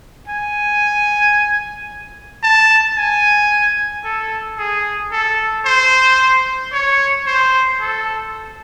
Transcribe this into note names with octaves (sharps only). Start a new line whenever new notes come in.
G#5
A5
G#5
A4
G#4
A4
C5
C#5
C5
A4